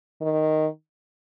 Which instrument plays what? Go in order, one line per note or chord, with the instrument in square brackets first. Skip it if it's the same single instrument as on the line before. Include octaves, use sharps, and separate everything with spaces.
[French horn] D#3